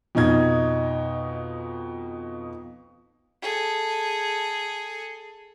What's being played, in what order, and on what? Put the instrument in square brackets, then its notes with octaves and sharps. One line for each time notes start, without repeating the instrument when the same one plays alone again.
[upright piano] F2 B2 D#4 G#6
[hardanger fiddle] G#4 A4